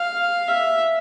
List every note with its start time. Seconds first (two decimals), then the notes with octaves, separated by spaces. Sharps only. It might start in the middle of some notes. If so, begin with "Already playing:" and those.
Already playing: F5
0.48 E5